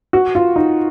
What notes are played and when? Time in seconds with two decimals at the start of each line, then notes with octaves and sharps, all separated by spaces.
0.13 F#4
0.35 F4
0.56 D#4